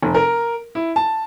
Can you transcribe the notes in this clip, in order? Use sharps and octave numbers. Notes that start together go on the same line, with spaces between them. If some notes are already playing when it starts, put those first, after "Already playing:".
F1
A#4
E4
A5